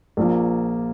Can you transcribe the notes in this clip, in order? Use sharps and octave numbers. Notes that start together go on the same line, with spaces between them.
A#1 A#2 F3 A#3